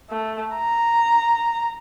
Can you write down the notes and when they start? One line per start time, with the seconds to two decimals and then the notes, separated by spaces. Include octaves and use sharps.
0.10 A3
0.56 A#5